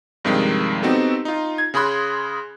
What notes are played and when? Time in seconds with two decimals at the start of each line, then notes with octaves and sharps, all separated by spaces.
0.25 G2 C3 D#3 F3 G#3
0.83 B3 C4 D#4 F#4 G4 A4
1.25 D#4 F4
1.58 G#6
1.74 C#3 G#4 B5 C6 F#6